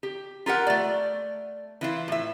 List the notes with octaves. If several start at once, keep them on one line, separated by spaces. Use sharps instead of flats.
G4
F4 G4 A#4 F#5
A3 D5
E3 E4 F4
A2 E5